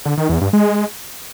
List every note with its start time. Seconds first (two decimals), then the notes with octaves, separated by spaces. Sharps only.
0.05 D3
0.17 D#3
0.29 E2
0.41 G2
0.53 G#3